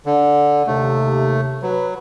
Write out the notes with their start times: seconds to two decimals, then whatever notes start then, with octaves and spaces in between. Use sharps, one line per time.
0.06 D3
0.67 D#2 C3 A3
1.63 F#3 B4